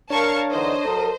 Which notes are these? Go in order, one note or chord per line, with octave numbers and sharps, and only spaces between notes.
D4 A#4 C#5 F5 A5 C#6
D3 E3 D#4 C5 D#5
F#3 A4 A#4